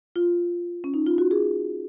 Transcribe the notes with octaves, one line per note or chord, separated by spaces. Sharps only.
F4
C#4
D#4
F4
F#4
G#4